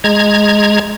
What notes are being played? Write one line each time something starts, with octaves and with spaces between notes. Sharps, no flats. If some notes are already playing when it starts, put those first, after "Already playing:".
G#3 A#5 G#6